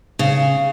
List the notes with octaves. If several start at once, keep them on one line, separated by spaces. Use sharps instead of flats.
C#3